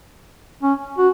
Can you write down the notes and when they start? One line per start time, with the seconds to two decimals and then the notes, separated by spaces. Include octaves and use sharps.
0.63 C#4
0.98 F#4